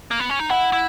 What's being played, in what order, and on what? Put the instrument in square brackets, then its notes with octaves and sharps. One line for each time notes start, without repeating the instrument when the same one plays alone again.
[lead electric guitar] A#3
B3
C#4
D#4
[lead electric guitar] E4 [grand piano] F#5
[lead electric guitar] E4